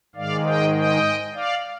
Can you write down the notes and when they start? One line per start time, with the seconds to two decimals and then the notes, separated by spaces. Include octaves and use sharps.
0.15 G#2 D#3 G#3 D5 F5
0.45 D#5 G5
0.74 D#5 G5
1.34 D5 F5